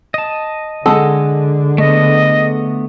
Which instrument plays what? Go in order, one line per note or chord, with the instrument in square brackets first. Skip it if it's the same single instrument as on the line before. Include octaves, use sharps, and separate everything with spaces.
[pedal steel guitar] D#5 A5
[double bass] D3 [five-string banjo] G#3 A4 F#5
[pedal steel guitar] A3 B3 [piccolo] D#5